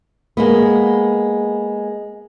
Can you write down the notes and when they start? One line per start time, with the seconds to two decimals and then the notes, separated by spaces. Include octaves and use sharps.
0.37 G#3 A#3 B3